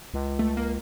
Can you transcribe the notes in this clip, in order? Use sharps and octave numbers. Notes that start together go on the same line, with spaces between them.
C#2
A3
A#3